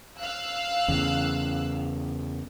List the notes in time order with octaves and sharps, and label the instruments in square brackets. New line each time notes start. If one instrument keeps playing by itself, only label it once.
[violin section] F5 E6 F#6
[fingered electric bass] E2 C#3